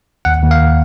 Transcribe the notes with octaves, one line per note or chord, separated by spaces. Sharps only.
D#2 F#5
D#2
F5